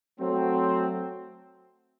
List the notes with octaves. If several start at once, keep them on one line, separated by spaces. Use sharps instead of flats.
F#3 A3 C4